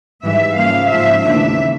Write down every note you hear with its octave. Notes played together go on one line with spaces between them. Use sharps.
G#2 E3 G3 E5
C#3 F3 A#3 F5
G#2 F3 G#3 E5
D#2 C#3 E3 A3 D4 E5